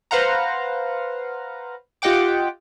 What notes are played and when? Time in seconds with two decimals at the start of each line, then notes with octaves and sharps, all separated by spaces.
0.11 B4 C5 F5 F#5 A#5
2.02 F4 G4 D#5 F#5 G5 D6